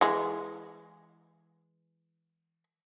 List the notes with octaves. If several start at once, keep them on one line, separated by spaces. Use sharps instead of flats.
E3 G#3